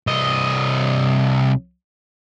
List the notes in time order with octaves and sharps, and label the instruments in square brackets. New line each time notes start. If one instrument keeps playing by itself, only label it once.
[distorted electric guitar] C2 D#5